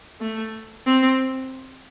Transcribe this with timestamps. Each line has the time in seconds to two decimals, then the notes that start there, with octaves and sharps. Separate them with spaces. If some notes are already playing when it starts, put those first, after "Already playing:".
0.21 A3
0.86 C4